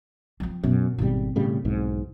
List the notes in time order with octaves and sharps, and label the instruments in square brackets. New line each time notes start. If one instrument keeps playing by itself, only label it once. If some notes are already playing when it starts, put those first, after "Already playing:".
[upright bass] F3 C4
[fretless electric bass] F#2 [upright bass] B2
[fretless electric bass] G#1 G3 [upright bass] B2 C4
[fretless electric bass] A2 C#3 G3
B1 E2 G#2